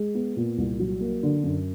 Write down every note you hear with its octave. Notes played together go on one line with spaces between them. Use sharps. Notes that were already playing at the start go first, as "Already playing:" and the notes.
Already playing: G#3
B3
A#2
C2
F#3
A#3
D3
F#2